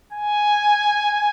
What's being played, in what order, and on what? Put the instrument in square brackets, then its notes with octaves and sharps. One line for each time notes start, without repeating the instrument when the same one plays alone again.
[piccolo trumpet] G#5